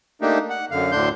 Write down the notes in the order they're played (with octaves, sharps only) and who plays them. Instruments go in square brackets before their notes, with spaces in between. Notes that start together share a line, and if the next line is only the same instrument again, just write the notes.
[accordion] A3 A#3 D4 D#4 G4
F#5
F#2 D3 F5
D2 A2 D3 D4 C6 G6